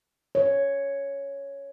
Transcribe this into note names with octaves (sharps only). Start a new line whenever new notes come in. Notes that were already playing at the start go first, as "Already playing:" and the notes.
C#5